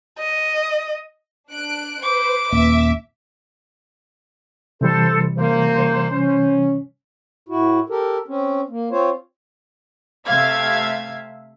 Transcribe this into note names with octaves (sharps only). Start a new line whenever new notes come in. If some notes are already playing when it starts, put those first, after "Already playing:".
D#5
D4 F#6 D7
B4 C5 D6
D#1 A#3 E5
C3 E3 G3 A4 C5
F#1 D2 A#3 C5
C#4
A2 E4 F#4
G4 A4 A#4
C4 C#4
A#3
C4 F4 C5 C#5
C3 A3 E5 F5 G#6